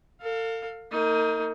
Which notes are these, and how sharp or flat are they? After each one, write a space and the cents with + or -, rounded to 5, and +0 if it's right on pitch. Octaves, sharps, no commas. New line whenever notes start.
A4 +40 F5 +10
A#3 -35 D#4 +25